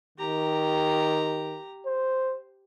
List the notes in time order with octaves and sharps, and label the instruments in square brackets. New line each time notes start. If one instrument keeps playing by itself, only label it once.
[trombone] D#3 [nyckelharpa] G4 A#5
[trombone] C5